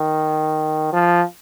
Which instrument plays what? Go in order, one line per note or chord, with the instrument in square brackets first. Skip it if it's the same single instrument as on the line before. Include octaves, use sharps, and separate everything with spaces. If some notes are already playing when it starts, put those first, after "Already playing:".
Already playing: [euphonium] D#3
F3